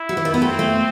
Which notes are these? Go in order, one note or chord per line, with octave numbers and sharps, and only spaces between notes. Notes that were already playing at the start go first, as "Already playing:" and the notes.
Already playing: E4
F#3
E3
D#3
B3
A3 C4
A3